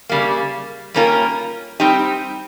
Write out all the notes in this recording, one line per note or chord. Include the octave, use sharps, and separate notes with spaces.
C#3 G3 A#3
G3 A#3 C#4 F4 A#4
G3 C4 D#4 G4